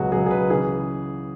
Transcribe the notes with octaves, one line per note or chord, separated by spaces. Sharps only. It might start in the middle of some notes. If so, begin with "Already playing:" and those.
Already playing: C#2 B2 F#3 F#4 G#4
C#2 B2 F#3 G#4
G#4
B4
C#3 E3 G#4